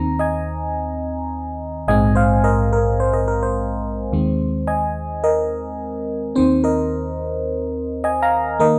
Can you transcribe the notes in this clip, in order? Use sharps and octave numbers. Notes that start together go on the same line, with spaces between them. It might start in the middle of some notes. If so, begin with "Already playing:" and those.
Already playing: D#2 D#3 C4 A#5
D#5 G#5
A#1 G#2 G#3 C4 D#5 G#5
C5 F5
A#4 D#5
A#4
C5
A#4 D#5
A#4
C5
D#2 D#3 G#3 C4
D#5 G#5
A#4 D#5
D#2 D#3 C4 C5
A#4 D#5
D#5 G#5
F5 A#5
D#3 A#3 A#4 D#5